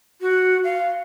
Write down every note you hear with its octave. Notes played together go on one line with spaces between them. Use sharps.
F#4
F5